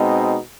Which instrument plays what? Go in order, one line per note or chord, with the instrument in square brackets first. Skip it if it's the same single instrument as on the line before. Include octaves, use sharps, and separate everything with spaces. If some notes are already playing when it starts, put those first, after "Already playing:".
Already playing: [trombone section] B2 G#3 C4 D#4